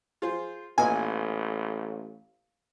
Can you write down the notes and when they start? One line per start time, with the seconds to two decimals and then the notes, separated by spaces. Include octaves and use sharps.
0.22 F4 G#4 C5
0.78 A1 A#2 B3 D#5 G#5